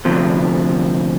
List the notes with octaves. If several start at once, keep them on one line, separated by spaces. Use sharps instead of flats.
D2 C3 F3